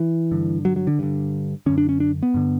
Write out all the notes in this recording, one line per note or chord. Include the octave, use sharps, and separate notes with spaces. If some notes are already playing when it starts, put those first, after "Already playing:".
Already playing: E3
G2 D3
F#3
F#3
D3
G2 D3
F#2 D3 C#4
D4
C#4
D4
B3
G2 D3